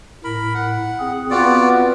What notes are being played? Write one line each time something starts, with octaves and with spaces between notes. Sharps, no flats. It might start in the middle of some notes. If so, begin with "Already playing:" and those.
A2 A#4 B5
F#5
C4 G#4
B3 C4 F4 F#4 D5